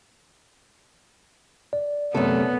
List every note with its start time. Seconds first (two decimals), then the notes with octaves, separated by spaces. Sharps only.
1.73 D5
2.15 F#2 C3 A3 B3 A4